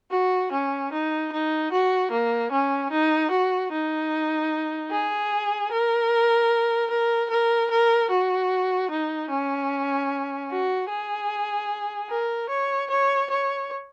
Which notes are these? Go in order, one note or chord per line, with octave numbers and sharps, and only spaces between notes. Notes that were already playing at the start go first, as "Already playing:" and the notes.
F#4
C#4
D#4
D#4
F#4
A#3
C#4
D#4
F#4
D#4
G#4
A#4
A#4
A#4
A#4
F#4
D#4
C#4
F#4
G#4
A#4
C#5
C#5
C#5